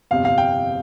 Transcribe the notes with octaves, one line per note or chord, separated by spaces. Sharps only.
G1 F2 C3 F5
F5
G5